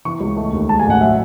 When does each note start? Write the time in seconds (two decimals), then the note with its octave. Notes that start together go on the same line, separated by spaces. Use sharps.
0.05 E3 C#6
0.20 C#2
0.37 A3
0.53 D#2
0.69 G#3 A5
0.79 G#5
0.85 A1
0.90 F#5
1.01 F#3 E5